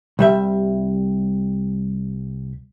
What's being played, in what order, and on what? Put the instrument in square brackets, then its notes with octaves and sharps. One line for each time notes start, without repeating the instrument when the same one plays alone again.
[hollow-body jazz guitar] C2 G3 E5